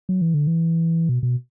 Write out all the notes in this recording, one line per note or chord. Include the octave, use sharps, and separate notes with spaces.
F#3
E3
D3
E3
B2
B2